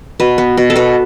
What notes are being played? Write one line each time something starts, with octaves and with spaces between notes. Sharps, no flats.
B2 B4
B3
B2
A4
B2 B4